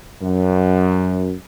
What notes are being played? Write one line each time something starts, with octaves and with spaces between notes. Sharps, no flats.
F#2